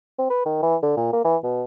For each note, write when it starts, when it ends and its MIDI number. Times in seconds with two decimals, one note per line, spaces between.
0.19 0.28 60
0.30 0.43 71
0.46 0.62 51
0.63 0.76 52
0.83 0.96 50
0.97 1.12 46
1.13 1.20 58
1.24 1.36 52
1.44 1.65 47